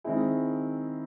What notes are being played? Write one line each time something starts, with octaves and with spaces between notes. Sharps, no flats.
D#3 G#3 C4 E4 G#4